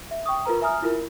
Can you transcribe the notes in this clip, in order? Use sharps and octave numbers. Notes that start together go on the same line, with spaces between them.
E5
G5 C#6 D#6
F4 A#4 B4 A#5
E5 G#5 A#5 D#6 F6
E4 F4 A#4